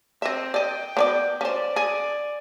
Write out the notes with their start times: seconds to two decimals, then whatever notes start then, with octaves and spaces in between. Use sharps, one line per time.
0.22 C4 D#5 E5
0.54 D5 D#5 G5
0.97 B3 C#5 D5
1.41 C#4 C5 D5
1.76 G#4